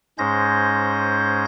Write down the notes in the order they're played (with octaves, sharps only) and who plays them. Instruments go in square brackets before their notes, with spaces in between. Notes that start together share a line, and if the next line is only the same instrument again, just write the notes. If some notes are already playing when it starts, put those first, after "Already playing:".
[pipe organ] G#2 G#3 C#4 C5 G6 A#6